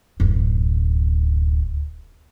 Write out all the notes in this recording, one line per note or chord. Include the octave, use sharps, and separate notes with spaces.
D1 F#2